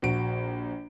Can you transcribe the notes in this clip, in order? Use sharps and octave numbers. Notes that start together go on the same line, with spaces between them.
A#1 F#4 D7